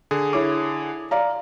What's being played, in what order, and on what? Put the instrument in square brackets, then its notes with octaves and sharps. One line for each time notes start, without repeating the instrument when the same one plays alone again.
[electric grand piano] D3 G#4
[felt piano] E4 C#5 D6
D5 F5 A#5